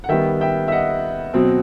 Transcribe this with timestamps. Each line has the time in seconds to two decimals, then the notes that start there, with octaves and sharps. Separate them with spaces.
0.04 F#5
0.09 D#3 G3 B3 E5 G5
0.41 E5 G5
0.68 E5
0.72 D#5 F#5
1.34 B2 F#3 C4